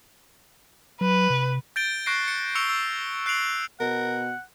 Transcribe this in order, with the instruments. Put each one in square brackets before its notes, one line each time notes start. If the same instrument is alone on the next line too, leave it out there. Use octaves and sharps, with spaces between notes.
[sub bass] F#3 [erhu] B4
[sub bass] C3
[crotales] G6 A6 D7 G7
C#6 F#6 A#6 C7 D7
C#7
C#6 E6 C#7 F7 G7
E6
F#6 C7 D7 F7 F#7
[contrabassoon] B2 [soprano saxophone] A#4 [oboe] F#5